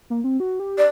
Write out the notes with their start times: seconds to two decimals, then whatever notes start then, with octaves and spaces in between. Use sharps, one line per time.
0.10 A#3
0.24 C4
0.40 F#4
0.60 G4
0.78 D5